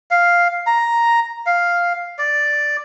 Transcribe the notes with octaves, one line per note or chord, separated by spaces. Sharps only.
F5
A#5
F5
D5